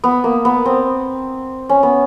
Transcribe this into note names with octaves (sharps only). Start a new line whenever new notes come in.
B3
A#3
B3
C4
C#4
B3